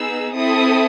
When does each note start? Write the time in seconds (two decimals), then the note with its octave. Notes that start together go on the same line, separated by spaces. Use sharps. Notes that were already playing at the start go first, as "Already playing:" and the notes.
Already playing: B3 D#4 G#4 E6
0.35 C4 E4 A4 D#6